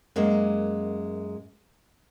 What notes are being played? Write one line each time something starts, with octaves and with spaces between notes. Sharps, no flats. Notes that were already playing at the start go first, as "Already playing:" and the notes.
F#2 G#3 A#3